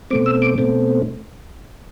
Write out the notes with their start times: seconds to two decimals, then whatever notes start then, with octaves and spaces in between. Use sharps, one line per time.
0.11 B2 A3 C4 D6
0.26 E6
0.42 D6
0.58 B2 A3 C4